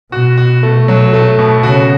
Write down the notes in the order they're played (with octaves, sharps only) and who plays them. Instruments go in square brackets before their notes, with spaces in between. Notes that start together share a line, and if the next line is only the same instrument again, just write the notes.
[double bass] B2 [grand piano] F#4
[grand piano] F#4
A3
F#3
A3
B2
[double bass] C#3 [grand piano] F#4